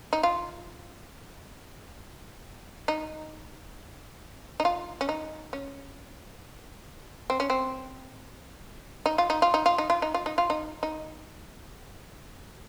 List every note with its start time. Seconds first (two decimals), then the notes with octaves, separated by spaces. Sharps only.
0.13 D#4
0.23 F4
2.88 D#4
4.60 D#4
4.65 F4
5.01 C#4
5.09 D#4
5.53 C#4
7.30 C4
7.40 C#4
7.50 C4
9.06 D#4
9.18 F4
9.30 D#4
9.42 F4
9.54 D#4
9.66 F4
9.78 D#4
9.90 F4
10.02 D#4
10.14 F4
10.26 D#4
10.38 F4
10.50 D#4
10.83 D#4